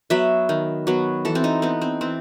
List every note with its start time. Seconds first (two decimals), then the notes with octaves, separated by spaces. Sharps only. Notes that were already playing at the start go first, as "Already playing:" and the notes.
0.10 F#3 B3 E5
0.49 D#3
0.87 F#3 B3
1.25 E3 A4
1.35 C4
1.44 D#4
1.62 B3 C4
1.82 C4
2.01 E3 C4